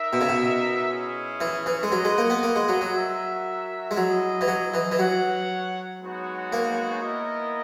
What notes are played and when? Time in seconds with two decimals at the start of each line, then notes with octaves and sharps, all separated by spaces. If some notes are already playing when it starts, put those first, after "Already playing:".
Already playing: D#4 A#4 E5
0.13 B2
0.21 C#3
0.29 B2
0.89 C#4 E4 G#4
1.41 E3
1.66 E3
1.83 G#3
1.92 F#3 F#4 B4 D#5 F#5
2.05 G#3
2.18 A#3
2.30 B3
2.43 A#3
2.56 G#3
2.69 F#3
2.81 F#3
2.95 F#4 A#4 E5
3.91 G#3
3.97 F#3 E4 G#4 D#5
4.41 E3
4.48 F#3
4.74 E3
4.91 E3
4.98 F#3 F#4 C#5 F#5
6.02 G#3 B3 D#4 F#4 C#5
6.53 A#3
7.03 B3 E4 A#4 D#5